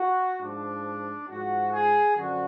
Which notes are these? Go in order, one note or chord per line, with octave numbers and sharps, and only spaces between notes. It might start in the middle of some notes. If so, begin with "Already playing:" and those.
Already playing: F#4
G#2 F3 D4
G#2 F3 F#4
G#4
F#2 D3 F3 F#4